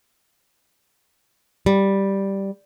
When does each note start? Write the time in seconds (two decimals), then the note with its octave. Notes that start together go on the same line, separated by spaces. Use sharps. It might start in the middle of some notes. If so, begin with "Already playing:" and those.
1.66 G3